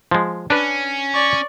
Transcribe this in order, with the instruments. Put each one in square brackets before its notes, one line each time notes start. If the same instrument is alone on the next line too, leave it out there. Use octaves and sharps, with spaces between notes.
[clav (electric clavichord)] F3 G#3
[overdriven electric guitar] C#4 [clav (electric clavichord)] D4 B4
[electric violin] D5 C#6